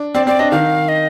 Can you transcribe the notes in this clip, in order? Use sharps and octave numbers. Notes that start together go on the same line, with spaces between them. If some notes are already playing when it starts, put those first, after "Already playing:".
Already playing: D4
C4 D5
C4 D5
D4 D#5
D#3 F5
D#5